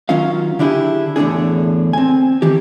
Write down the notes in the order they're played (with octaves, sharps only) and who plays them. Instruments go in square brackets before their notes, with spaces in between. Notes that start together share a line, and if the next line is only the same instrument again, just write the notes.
[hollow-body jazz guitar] D#3 F#3 C#4 F4 F5
D3 D4 E4 G4 G#4
E2 A2 D3 D4 G#4
C4 G#5
D#3 E3 G4